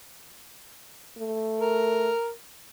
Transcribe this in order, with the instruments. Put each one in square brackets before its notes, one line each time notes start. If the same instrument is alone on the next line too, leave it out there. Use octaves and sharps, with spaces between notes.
[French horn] A3
[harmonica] A#4